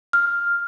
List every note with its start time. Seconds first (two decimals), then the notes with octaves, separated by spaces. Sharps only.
0.13 F6